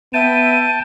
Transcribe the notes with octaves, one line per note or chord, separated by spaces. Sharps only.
B3 E5 G5 A5 D#7